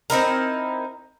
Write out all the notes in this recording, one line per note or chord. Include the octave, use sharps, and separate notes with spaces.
C4 D#4 E4 A#4